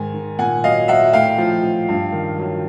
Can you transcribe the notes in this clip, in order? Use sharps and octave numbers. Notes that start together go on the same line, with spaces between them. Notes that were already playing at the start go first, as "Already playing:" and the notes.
Already playing: G#2 D#3 G#5
D#3
A#2 F#5 G#5
F#3 D#5 F5
F#3 E5 F#5
A2 F5 G5
F3
F3
G2
D#3
F#3